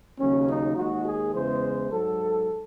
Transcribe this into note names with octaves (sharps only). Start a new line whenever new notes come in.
D#2 C#3 F#3 C#4
D#4
D#2 D#3 G#3 F#4
G#4
E2 C#3 E3 G#3 C5
G#2 F#3 A4